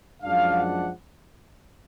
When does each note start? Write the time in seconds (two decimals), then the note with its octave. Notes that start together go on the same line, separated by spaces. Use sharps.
0.22 F#2 F3 G#3 D4 F5
0.57 F#5